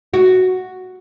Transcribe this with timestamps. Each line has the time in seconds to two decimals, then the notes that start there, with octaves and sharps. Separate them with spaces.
0.14 F#4